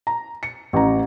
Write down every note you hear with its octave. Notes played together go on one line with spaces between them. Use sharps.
A#5
C#7
A1 A#5